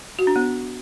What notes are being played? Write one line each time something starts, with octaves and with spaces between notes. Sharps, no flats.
F#4
D4
B3